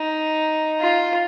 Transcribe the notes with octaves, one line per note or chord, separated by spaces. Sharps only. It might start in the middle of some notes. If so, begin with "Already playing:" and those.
Already playing: D#4
F4